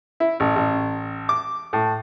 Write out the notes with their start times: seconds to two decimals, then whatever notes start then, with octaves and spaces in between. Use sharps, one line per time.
0.20 E4
0.40 A1
0.56 A1
1.29 D6
1.73 A2